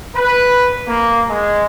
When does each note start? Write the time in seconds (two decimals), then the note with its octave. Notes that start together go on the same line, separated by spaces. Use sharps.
0.16 B4
0.87 A#3
1.29 G#3